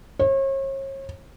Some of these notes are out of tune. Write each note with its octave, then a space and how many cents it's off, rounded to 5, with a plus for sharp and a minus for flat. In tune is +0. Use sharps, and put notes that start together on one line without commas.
C#5 -40